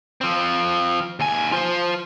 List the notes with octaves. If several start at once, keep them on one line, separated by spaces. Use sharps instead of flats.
F3 C4
D#2 G#5
F4 C5